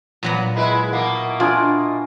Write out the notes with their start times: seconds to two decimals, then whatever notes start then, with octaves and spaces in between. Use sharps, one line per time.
0.23 A#2 F#3 B3
0.56 G#3 E4 B4
0.92 B2 A#3 E4
1.40 D4 F4 G#5 D#6